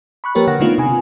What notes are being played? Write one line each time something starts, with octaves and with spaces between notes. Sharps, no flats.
B5 C#6 F#6
F3 A#3 G4 A#4 B4 C#5
D3 F#5 A#6
D3 A3 B3 D4 D#4 F4
C3 G#5